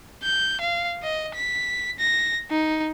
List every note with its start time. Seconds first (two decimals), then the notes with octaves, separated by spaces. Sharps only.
0.23 G6
0.61 F5
1.03 D#5
1.35 B6
1.99 A#6
2.50 D#4